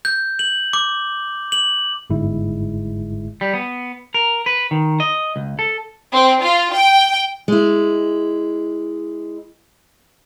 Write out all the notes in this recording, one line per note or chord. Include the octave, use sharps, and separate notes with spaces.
G6
F#7
D6
F#7
G1 G#2 G#3 E4
G3
B3
A#4
B4
D#3
D#5
C#2
A4
C4
F4
G5
G#3 E4